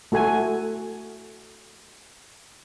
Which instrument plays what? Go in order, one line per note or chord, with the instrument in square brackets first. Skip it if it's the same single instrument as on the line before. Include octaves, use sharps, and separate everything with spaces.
[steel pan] A3 F#4 A4 G#5